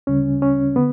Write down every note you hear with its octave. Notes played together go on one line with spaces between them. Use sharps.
D2 C#3 G3 C#4
C#4
D3 B3